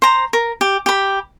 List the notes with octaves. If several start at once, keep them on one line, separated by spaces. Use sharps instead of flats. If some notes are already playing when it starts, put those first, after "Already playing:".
C5 A#5
A#4
G4
G4 B5